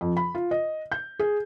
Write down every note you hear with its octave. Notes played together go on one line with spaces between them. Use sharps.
F2
B5
F4
D#5
G6
G#4